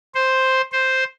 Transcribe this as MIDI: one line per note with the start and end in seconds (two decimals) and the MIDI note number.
0.15 0.62 72
0.72 1.04 72